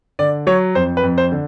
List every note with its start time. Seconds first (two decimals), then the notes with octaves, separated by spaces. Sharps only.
0.19 D3 D5
0.47 F#3 C#5
0.75 F2 C5
0.97 B4
1.03 F2
1.18 C5
1.32 D3